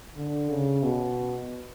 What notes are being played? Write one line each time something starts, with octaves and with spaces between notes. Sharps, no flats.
D3
C#3
B2